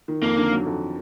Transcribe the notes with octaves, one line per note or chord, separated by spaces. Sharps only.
D#3
F2 A#3
D3
F#3
F2